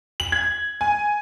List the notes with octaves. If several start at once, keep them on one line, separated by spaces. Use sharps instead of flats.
F#7
G#6
G#5